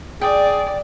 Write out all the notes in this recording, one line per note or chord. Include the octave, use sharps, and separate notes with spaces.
G#4 D5 G5